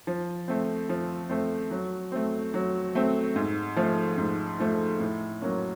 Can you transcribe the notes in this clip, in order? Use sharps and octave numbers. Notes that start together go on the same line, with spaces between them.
F3
A3 C4
F3
A3 C4
F#3
A3 C4
F#3
A3 C4
G#2
F3 A3
G#2
F3 A3
A2
F#3 A#3 C#4